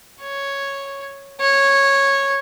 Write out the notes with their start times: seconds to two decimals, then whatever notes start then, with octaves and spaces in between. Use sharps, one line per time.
0.22 C#5
1.41 C#5